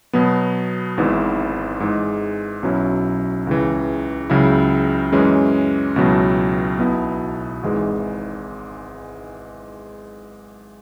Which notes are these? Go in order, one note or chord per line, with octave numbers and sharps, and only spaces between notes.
B2 F#3 B3
G#1 G#2 E3 B3 E4
G#2 E3 G#3
B1 B2 F#3 C#4 E4
C#2 C#3 E3
C#2 C#3 F#3 E4
F#2 E3 G#3 C#4
C#2 B2 F#3 B3 E4
B1 B2 B3 E4
G#1 G#2 E3 G#3